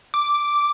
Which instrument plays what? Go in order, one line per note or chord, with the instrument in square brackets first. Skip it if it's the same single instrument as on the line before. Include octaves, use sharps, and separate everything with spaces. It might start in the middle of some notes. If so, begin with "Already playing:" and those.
[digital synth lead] D6